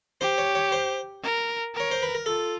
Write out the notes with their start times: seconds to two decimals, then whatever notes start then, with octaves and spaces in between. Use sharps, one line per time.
0.21 G4 C5
0.38 C#5
0.55 C#5
0.72 C5
1.23 A#4
1.75 A#4
1.80 C#5
1.91 C5
2.03 B4
2.15 A#4
2.26 F4 A4